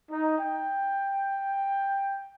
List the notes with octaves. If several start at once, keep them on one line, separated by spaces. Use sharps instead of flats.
D#4
G5